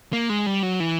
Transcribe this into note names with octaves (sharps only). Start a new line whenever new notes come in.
A#3
G#3
G3
F#3
E3